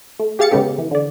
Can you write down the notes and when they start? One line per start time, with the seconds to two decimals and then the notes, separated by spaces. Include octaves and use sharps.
0.20 A3
0.39 G4 G#4 F5 A6 C#7
0.51 C#3 G#3 B3 C#4 G4 A4
0.78 E3
0.91 D3 D5